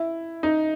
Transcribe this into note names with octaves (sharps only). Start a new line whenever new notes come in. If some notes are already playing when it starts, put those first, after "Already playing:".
Already playing: E4
D#4